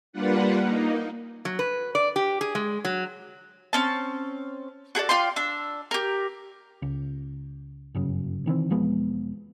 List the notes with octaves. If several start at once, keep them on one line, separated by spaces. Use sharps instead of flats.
G3 A#3 D4 F4 B4 F#5
A#3 D#4
F#3
B4
D5
G4
G#4
G#3
F#3
C4 C#4 A5
F#4 G#4 A4 D5
F4 D5 G5 C6
D4 E6
G4 A#4
C#2
G1 F#2 C#3
C3 D#3 E3 C4
E1 F3 G#3 B3